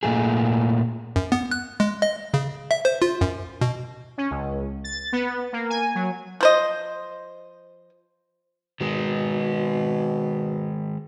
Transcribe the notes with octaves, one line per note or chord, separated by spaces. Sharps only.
A#2 A3 G#4
F#2
B3
F#6
G#3
D#5
C#3
E5
C5
F4
F#2
B2
C#4
C#2
A6
B3
A#3
G#5
F#3
F3 C5 D#5
B2 D#3 G#3